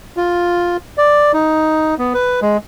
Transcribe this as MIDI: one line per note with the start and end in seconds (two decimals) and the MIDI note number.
0.17 0.77 65
0.98 1.32 74
1.33 1.95 63
1.98 2.13 59
2.14 2.40 71
2.42 2.57 56